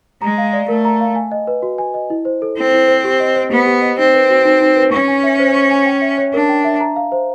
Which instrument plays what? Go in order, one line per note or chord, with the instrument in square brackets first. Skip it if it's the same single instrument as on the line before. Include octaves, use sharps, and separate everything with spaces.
[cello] G#3 [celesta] A#5
[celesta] F5
D5
[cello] A3 [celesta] A#4
[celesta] A#5
F5
G#5
D#5
B4
F#4
G#5
D#5
E4
C5
A4
[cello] C4 [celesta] E4
[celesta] E4
C5
G4
D#5
C5
[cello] B3 [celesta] G4
[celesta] G4
D#5
[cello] C4 [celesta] D#4
[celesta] B4
F#4
D#4
D#4
B4
[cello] C#4 [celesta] C#6
[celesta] G#5
E5
C5
C#6
G#5
G5
E5
C#5
[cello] D4 [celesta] A#4
[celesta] G5
E5
A#5
F5
C5